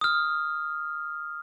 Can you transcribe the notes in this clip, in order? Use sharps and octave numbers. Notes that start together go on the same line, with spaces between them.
D#6 F6